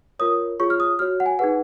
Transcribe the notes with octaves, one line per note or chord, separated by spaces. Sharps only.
F4 A#4 C#5 D#6
F4 G#4 C#5 C#6
F6
D#6
F#4 C#5 F6
F#5
G#5
D#4 G#4 B4 F#5